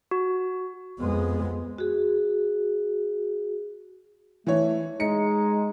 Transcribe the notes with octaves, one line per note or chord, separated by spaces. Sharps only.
F#4
F2 G#3 B3
F#4 G#4
E3 A3 C#5
G#3 D#4 C#7